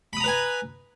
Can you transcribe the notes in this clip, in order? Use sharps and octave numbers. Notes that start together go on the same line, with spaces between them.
B4 G#5 A#5 B5 D#6